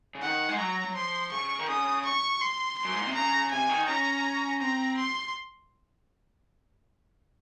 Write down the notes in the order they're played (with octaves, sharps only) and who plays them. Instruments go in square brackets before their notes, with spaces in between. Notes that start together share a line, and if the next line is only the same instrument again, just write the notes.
[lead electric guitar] C#3
[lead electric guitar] D#3 [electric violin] F#5
[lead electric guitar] G#3
[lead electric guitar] F#3 [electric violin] A#5
[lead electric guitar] F#3
[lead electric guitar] F3 [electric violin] C6
[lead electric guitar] C#3 [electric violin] C#6
[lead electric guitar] D#3
[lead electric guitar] C#3 [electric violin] D#6
[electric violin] C#6
C6
C6
[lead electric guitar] F#2
G#2
A#2
C3
[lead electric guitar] C#3 [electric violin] A#5
[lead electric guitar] C3 [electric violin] G#5
[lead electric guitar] D#3
[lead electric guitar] C#4 [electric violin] A#5
[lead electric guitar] C4 [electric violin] A#5
[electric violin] C6